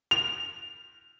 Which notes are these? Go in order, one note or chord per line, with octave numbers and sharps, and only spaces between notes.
F7